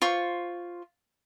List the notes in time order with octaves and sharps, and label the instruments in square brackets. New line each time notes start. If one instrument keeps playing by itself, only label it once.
[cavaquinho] F4 C5 C#6